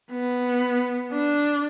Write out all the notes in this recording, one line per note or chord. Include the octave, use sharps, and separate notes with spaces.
B3
D4